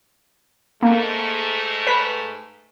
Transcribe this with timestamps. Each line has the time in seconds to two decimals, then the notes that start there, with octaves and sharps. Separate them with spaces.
0.83 G#2 A3 A#3
1.87 B4 B6